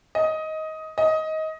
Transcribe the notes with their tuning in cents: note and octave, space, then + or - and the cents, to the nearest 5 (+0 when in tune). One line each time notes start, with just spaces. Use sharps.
D#5 +15
D#5 +20